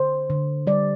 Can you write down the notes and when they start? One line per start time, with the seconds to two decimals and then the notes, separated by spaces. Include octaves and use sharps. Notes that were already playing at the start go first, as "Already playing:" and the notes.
Already playing: D3 C5
0.30 D3
0.67 G3 D5